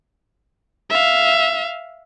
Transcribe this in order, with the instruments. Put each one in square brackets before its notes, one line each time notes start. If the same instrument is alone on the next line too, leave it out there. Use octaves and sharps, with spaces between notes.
[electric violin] E5 F5